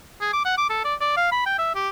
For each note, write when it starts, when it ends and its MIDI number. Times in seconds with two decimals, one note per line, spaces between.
0.21 0.31 68
0.33 0.43 86
0.45 0.57 78
0.57 0.68 86
0.69 0.83 69
0.85 0.94 74
1.01 1.16 74
1.17 1.31 77
1.32 1.42 83
1.46 1.58 79
1.58 1.70 76
1.75 1.89 67